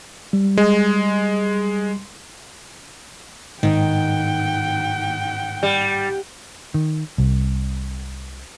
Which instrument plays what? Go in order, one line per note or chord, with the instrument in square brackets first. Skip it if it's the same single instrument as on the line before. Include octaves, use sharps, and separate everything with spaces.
[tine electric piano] G3
[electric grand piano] G#3
[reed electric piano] G#2 [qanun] D#3 [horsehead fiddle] F#5 G5
[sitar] G3
[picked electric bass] D#3
C2